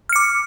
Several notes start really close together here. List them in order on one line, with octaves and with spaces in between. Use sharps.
F6 C#7 D6